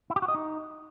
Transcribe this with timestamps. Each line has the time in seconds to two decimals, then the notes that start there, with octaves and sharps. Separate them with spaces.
0.10 E4
0.16 G4
0.22 F#4
0.28 D#5
0.35 D#4